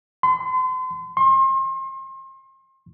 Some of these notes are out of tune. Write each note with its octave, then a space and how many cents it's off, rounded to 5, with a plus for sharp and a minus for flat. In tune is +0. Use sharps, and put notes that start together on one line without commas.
C6 -40
C6 +35